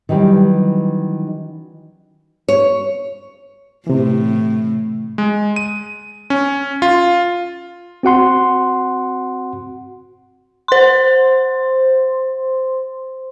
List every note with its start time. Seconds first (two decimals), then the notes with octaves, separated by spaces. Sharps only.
0.09 D#3 E3 F#3 G3 C#4
2.49 C#5
3.87 A2 C3 E3
5.18 G#3
5.56 D#7
6.30 C#4
6.82 F4
8.03 C4 F#4 F#5 C6
10.68 C5 C6